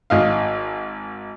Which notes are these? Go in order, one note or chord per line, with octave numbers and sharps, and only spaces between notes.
G#1 D#5 F5